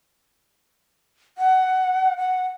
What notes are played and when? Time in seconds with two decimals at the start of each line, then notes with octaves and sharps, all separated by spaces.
1.38 F#5
2.17 F#5